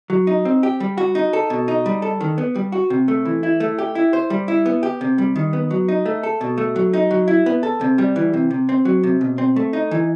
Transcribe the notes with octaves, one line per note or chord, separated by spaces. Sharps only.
F#3
D#4
C4
G4
G3
F#4
D#4
A4
B2
D#4
G3
A4
D#3
B3
G3
F#4
C3
A3
E3
E4
A3
G4
E4
C5
G3
E4
B3
G4
C3
G3
D#3
B3
F#3
D#4
A3
A4
B2
A3
F#3
D#4
F#3
E4
B3
A4
C3
G3
E3
C3
C3
C4
F#3
C3
B2
C4
A3
D#4
E3